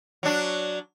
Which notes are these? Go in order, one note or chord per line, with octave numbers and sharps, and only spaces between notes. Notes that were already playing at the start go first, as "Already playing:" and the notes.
F#3 D4